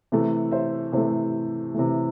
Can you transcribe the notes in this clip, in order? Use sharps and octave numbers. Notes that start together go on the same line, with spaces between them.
C3 E3 A3
C5 E5
C3 E3 A3 C5
C3 E3 A3